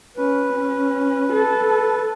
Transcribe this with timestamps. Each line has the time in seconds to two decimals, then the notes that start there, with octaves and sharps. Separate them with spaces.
0.17 C#4 B4
0.53 C#4
1.33 A4